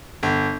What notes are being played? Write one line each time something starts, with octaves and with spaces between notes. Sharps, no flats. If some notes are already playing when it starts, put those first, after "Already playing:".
G1